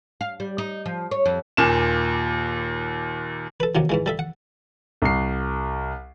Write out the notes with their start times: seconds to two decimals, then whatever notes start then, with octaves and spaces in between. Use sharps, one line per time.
0.21 F5
0.40 G3
0.58 D#4
0.86 F3
1.11 C#5
1.26 F2
1.57 D#2 A#2 G#5 E7
3.60 A4 B4
3.75 D#2 C3 D#3 F#3
3.89 G#2 E3 G#3
4.06 G3 A4 E5
4.19 F#5
5.02 C2 C7